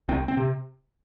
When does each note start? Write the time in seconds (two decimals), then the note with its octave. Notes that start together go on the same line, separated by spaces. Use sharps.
0.09 C2 C4
0.28 C4
0.37 C3